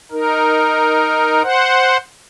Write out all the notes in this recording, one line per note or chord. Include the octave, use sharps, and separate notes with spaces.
D#4 A#4
C5 F#5